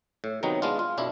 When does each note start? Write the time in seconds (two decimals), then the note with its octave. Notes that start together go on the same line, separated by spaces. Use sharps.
0.24 A2
0.43 C3 D#3 F#3 B3 D#4
0.62 G#3 B3 D4 F4
0.79 F4
0.98 B1 F#2 D4 E4